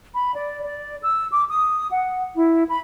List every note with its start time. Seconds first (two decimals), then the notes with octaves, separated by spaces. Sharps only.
0.13 B5
0.35 D5
0.63 D5
1.01 E6
1.31 D6
1.50 D#6
1.90 F#5
2.36 E4
2.69 B5